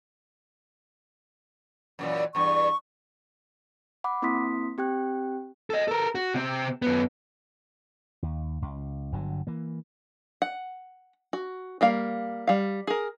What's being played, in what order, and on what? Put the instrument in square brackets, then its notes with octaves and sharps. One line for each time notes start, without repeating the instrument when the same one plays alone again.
[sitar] F#2 A#2 E3
[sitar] E2 G2 [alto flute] C#6
[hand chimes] F#5 B5 D6
A#3 C4 E4 C6 D#6 B6
C4 G4 G5 F#6
[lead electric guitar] A4 D#5
A4 A#4
F#4
C3 C4
F#2 B3
[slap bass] D#2
C#2
G1 D3 F#3
E3 A#3
[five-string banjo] F#5
F#4
G3 A#3 F5
G3 F5
G#4 A#4